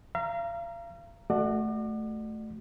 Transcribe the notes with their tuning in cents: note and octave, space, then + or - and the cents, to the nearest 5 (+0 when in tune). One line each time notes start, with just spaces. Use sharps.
F5 -35 A#5 +0
A3 -10 F#4 +0 D5 +35